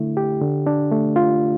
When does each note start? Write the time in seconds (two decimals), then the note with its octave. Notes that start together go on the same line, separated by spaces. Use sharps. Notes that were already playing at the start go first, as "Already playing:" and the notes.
Already playing: D3 A3 E4
0.17 G4
0.41 D3
0.67 D4
0.91 A3
1.16 F4